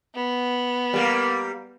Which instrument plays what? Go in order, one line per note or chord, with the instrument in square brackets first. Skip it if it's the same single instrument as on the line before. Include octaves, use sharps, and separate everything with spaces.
[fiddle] B3
[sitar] G3 A#3